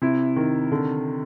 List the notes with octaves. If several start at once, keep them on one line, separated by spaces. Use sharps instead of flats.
C3 E4
D#3
D3